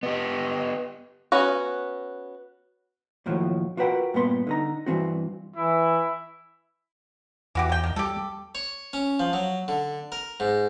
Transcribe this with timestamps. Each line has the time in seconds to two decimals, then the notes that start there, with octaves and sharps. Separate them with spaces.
0.03 B3 G4 D#5
1.32 B3 C#4 F#4
3.26 D#2 A2 F3 F#3
3.77 F4 F#4 A#4 B4 F#5 G5
4.14 G2 A#2 B3 C6
4.47 D3 D#4 A#5
4.86 G2 D#3 E3 C4 F#4
5.56 E3 E4
7.55 E2 E3 F#4 G4
7.69 D3 G5
7.84 D#3
7.96 G3 G4 A4
8.55 C#5
8.93 C#4
9.19 F3
9.33 F#3
9.68 D3
10.12 A#4
10.40 G#2